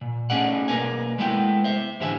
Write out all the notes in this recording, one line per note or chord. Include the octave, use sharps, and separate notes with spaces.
A#2
A3 C#4 D#4 G#4 D5 F#5
B1 D#3 A#3 A#4 B4 G#5
G#3 A3 B3 E4 C5 G5
C5 E5
A2 D3 E3 G4 E5 G#5